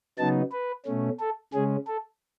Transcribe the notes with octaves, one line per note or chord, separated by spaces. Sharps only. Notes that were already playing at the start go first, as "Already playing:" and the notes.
C#3 F#3 B3 D#4 A5
B4
B2 A3 C#4
A4
C#3 G#3 C#4 G#4
A4